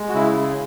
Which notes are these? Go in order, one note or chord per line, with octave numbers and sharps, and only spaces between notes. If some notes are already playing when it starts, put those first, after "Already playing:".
Already playing: G#3
F#4
C#3 E4